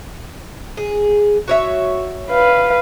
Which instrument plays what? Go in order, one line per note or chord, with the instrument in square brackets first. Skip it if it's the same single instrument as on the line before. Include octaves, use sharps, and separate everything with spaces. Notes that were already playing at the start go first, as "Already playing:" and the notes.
[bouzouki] G#4
F#4 C#5 E5
[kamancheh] B4 F5